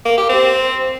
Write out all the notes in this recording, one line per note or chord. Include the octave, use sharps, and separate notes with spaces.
A#3
G4
C4